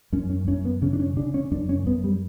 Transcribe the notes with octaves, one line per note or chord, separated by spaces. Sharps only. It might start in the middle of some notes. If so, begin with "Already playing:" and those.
F#2 C#4
C#4
F#2 C#4
B3
C#3 C#4
D4
C#4
C#3 D4
C#4
F#2 D4
C#4
F#2 B3
G3